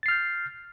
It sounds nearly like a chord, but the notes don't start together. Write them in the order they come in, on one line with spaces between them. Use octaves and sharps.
A6 C7 F6 G6